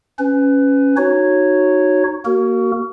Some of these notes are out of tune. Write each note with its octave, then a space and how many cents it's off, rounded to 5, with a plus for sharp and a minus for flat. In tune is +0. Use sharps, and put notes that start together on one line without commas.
C#4 +0 B4 +20
D#4 -15 F#4 +0 C#5 -5
A#3 +0 F#4 +30 A#4 -20